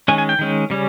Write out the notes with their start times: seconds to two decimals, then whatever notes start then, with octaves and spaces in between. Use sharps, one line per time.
0.08 D#3 G#3 C#4 G#5
0.18 G#5
0.29 G5
0.39 D#3 G#3 C#4
0.70 C#3 G3 C#4